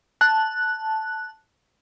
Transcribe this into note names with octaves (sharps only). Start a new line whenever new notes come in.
A5 F#6